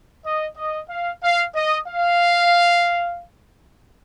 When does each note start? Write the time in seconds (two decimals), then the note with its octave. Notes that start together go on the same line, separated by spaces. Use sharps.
0.24 D#5
0.56 D#5
0.89 F5
1.23 F5
1.55 D#5
1.88 F5